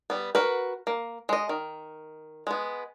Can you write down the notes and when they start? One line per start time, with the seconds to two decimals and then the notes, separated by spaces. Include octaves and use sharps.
0.10 G3 B3
0.35 F#4 A#4 B4
0.87 A#3
1.29 G#3 D#5
1.49 D#3
2.47 G#3 B3